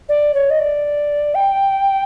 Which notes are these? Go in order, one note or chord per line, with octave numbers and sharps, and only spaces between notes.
D5
C#5
D#5
D5
G5